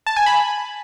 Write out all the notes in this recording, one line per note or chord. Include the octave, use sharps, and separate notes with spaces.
A5
G#5
B5